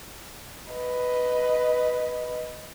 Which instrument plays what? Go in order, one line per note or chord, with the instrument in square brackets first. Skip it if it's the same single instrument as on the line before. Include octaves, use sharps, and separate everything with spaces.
[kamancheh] B4 D#5